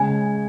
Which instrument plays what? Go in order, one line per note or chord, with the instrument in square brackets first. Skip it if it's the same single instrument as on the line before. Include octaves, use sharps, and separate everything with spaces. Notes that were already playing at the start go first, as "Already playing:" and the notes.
Already playing: [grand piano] C#3 G#3 C#4 [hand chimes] G#5